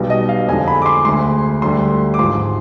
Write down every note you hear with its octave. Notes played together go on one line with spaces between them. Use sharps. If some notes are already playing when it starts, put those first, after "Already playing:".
Already playing: B1 B2 G3
D#5
F5
F2 D3 G#3 G#5
B5
D6
C6
D2 D3 G#3 C6
D2 D3 G3 C6
D6
G#1 G#2 F3 G#3 C6